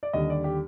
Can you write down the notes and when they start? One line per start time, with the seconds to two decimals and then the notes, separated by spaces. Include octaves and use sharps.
0.03 D5
0.13 D#2 D3 G3 D#5
0.30 D5
0.44 G4